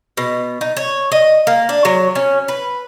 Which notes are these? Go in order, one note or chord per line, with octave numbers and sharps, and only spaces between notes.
B2
D#4
C#5
D#5
A#3
D4
F#3
C#4
B4